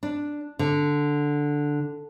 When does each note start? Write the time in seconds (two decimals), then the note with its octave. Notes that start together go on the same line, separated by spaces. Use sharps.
0.03 D4
0.59 D3